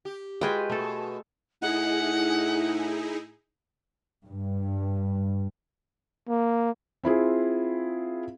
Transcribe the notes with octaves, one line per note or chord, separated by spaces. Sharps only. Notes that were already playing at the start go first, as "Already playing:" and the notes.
G4
G#3 F4 F#4 G#4 B4 G5
B2 A3 A4
A2 D#4 E4 G#4 F#5
G2
A#3
C4 E4 F4 G#4